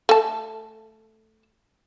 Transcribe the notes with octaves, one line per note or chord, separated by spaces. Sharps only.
A3 A5